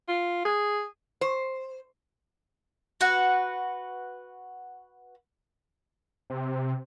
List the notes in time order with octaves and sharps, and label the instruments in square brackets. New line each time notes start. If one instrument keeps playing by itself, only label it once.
[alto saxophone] F4
G#4
[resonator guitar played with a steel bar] C5
[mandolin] F#4 B4 F#5
[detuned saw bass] C3